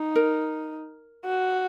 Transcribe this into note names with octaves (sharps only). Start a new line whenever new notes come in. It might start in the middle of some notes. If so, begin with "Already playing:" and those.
Already playing: D#4
A#4
F#4